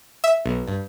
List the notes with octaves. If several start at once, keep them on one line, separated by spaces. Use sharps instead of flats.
E5
B1
G2